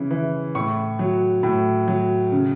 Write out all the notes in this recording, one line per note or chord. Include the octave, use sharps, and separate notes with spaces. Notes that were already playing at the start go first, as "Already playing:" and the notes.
Already playing: C#3 E3
E3
A2 C#6
F#3
A2
F#3
C#3